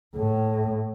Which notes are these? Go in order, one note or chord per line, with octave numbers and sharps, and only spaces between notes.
A2